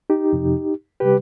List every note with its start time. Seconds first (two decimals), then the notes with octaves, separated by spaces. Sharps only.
0.10 D#4 G4
0.33 F2 C3 F3
1.00 C3 G3 G4 B4